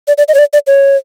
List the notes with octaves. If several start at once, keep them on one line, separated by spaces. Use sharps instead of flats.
D5
D5
D#5
C#5
D5
D5
C#5